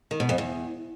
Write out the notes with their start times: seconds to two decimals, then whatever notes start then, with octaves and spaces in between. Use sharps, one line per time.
0.11 D#3
0.20 B2
0.29 F2
0.38 E2